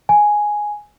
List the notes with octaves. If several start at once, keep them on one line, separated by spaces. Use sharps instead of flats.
G#5